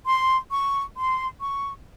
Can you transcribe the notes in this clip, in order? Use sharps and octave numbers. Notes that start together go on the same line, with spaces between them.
C6
C#6
C6
C#6